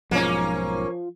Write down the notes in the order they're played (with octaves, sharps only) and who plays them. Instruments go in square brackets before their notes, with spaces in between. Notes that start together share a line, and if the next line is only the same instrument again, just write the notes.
[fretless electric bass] B1 G#2 [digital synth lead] F3 [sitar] A#3 C#4